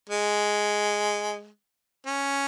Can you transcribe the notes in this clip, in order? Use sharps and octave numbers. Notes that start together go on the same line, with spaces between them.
G#3
C#4